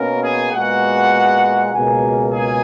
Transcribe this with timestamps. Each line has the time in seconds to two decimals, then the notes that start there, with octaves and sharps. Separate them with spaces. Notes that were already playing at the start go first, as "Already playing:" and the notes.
Already playing: B2 A#3 C#4 A#4
0.24 G#4 G#5
0.53 A#2 G#3 B3 F#4 F#5
1.72 C#2 B2 A#3 G#4 G#5
2.32 G#4 G#5